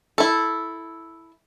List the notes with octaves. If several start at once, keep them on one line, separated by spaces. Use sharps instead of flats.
E4 A4